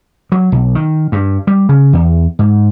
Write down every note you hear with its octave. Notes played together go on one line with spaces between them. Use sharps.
F#3
B1
D#3
G2
G3
C#3
E2
G#2